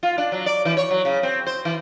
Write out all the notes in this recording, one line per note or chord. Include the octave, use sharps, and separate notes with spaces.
F4
D4
F#3
D5
E3
C#5
F#3
C#3
C4
C5
E3